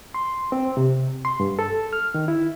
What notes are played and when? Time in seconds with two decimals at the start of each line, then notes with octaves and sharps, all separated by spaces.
0.14 C6
0.52 C4
0.77 C3
1.25 C6
1.40 G2
1.59 A4
1.93 F6
2.14 D#3
2.28 E4